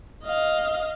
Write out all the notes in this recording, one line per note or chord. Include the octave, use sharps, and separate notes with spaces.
D#5 F5